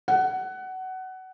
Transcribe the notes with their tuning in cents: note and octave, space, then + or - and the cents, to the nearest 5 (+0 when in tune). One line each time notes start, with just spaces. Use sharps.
F#5 +20